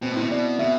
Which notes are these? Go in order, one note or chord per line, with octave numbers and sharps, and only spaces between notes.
B2 C4
A2
E4
B2
B2 D5
B2 E5